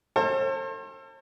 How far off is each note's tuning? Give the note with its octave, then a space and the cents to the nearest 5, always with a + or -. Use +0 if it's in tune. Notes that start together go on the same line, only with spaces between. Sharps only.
A4 +40 C5 +40